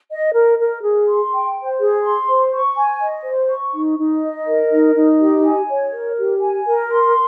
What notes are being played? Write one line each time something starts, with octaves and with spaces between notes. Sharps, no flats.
D#5
A#4
A#4
G#4
C6
G5
C5
G#4
C6
C5
C#6
G#5
D#5
C5
C#6
D#4
D#4
D#5
A#4
D#4
D#4
G4
G#5
C#5
A#4
G4
G#5
A#4
C6